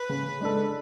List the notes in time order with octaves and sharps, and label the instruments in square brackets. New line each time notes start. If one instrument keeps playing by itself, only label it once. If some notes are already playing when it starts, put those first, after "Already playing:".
Already playing: [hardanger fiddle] B4
[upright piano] C#3
G#3 D4 A4